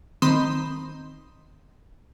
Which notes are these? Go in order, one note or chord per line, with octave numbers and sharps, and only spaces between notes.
D#3 C4 B5 C6 D#6 E7